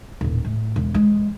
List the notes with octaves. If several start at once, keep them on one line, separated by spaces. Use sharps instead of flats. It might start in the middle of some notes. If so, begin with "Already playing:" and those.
D#1 A1
A2
E1
E3 G#3